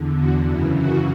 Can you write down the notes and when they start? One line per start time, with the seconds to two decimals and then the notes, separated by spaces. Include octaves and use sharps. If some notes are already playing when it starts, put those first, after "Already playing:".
Already playing: E2 D3
0.18 F#4
0.47 F#2 C#3 E3 E4
0.76 F#4